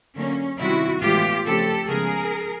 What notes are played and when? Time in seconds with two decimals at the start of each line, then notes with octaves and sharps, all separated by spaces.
0.16 D3 F#3 A#3 C#4
0.59 C3 D#3 G3 C4 E4 F#4
1.02 A2 E3 G#3 B3 F4 G4
1.46 C#3 F3 A3 C4 G4 A4
1.88 C#3 F3 G#3 B3 G#4 A#4